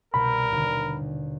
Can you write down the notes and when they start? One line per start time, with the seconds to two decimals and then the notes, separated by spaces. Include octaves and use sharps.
0.14 C2 B2 A#4 B5 G6
0.52 D#2 B2 D3